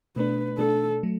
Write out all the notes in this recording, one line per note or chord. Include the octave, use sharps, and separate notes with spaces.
B2 A3 D4 B4
B2 A3 D4 A4
F#3 A3